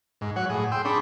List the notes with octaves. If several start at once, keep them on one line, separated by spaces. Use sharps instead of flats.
G#2
F#3 C#5 F#5
A2 G#4
G5 C6 E6
C#4 D4 G#4 B5